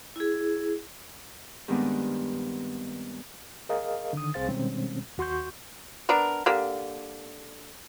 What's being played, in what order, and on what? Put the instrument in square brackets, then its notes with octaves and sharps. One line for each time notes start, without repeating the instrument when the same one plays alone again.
[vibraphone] E4 G#4
[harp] G2 D#3 G#3 B3 C4 D4
[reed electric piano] G#4 A#4 D#5 F5
D3 D#3 D#6
C2 C4 G#4 C5 F5 A6
B2 D#3 G3 G#3 C4 C#4
D#2 F#4 C6 C#6 G6
[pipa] B3 D4 A#4
D3 A#3 G4